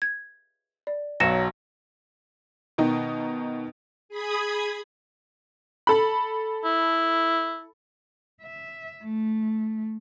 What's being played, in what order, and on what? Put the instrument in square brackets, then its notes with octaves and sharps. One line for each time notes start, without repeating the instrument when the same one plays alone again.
[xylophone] G#6
D5
[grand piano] B1 F#3 [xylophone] A#6 C#7 E7
[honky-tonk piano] B2 D#3 D#4
[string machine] G#4 B5 D#6 G#6
[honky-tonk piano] A4 B5
[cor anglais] E4
[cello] E5
A3